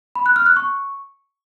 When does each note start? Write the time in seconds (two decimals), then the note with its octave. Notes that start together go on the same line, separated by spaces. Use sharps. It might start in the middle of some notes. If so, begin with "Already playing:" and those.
0.15 B5
0.26 F#6
0.36 F6
0.46 F#6
0.56 C#6